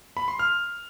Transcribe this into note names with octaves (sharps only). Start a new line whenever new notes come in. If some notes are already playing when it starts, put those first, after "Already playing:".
B5
C6
F6